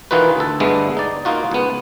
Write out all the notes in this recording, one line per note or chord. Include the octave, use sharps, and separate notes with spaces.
D#3 E3 D#4 F4 F#4 B4
D2 A4
G2 D3 G#3 A3 B3
D#4 D5
A#3 D#4 F4 F#4
C#2 B3